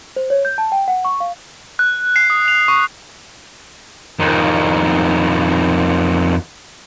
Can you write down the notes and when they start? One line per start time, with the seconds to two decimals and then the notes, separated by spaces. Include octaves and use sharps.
0.16 C5
0.30 C#5
0.45 G6
0.58 A5
0.72 G5
0.88 F#5
1.05 C#6
1.20 F5
1.79 F#6
2.16 C7
2.30 D#6
2.48 F7
2.68 C#6
4.20 F2 D#3